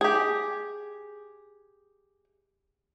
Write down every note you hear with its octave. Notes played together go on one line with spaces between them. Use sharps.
G4 G#4